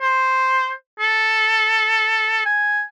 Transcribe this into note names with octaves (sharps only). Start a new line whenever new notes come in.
C5
A4
G#5